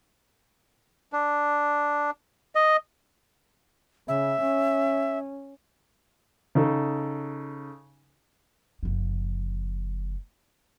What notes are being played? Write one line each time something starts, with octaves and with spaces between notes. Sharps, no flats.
D4
D#5
C#3 E5
C#4
C#3 D#4 A4
F#1 F3